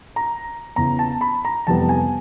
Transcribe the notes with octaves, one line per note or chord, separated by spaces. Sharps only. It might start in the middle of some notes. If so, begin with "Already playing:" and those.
A#5
E2 C#3 E3 A#5
A5
B5
A#5
F2 C3 E3 G3 B3 A5
G#5